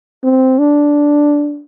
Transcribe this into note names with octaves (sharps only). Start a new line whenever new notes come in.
C4
D4